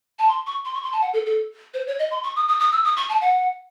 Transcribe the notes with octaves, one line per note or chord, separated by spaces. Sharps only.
A5
C6
C#6
C6
C#6
C6
A5
F#5
A4
A4
C5
C#5
D#5
C6
C#6
D#6
D#6
D#6
E6
D#6
C#6
A5
F#5